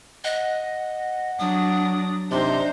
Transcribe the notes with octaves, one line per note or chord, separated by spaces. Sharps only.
D#5 F#5
F#3 D4 D#6
C3 D4 D#4 C5 C6